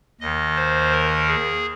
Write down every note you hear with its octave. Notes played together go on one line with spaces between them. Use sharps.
D#2 D#3 D#5
C5
A#4
G#4